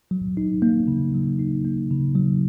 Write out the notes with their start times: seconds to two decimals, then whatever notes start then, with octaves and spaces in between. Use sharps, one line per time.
0.11 F#3
0.37 D#4
0.62 A#3
0.88 C#3
1.14 F#3
1.39 D#4
1.65 A#3
1.91 C#3
2.15 F#3